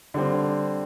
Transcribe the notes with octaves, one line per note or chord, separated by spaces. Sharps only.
D3 G3 C4